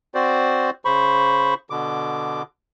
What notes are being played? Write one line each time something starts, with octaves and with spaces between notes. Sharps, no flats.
C4 F#4 C5 D5
C#3 C5 B5 C#6
B2 D3 D6